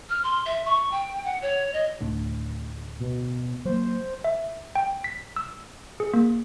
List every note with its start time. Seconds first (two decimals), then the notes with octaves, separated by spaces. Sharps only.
0.10 F6
0.23 C6
0.46 E5
0.65 C#6
0.92 G5
1.25 F#5
1.42 C#5
1.74 D#5
2.01 D2 A2 D3
2.99 B2
3.65 F#3 A#3 C5
4.24 E5
4.75 G5
5.04 B6
5.36 E6
6.00 G#4
6.14 A#3